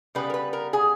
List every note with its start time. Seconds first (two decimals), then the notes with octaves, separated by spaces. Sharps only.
0.15 C#3 G3 B3 B4
0.30 A#4
0.34 B4
0.53 A#4
0.73 G#4